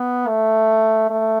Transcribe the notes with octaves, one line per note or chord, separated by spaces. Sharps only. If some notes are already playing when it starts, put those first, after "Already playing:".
Already playing: B3
A3
A3